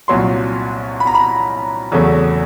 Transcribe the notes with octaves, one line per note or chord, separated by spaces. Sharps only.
C2 A#2 F#3 C6
B5
A#5
B5
E2 C#3 F#3 A3